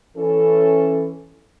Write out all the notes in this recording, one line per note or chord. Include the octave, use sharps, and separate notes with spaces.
E3 C#4 A4